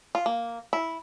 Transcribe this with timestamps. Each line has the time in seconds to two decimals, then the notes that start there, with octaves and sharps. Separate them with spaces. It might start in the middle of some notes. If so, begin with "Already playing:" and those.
0.15 F4
0.26 A#3
0.73 E4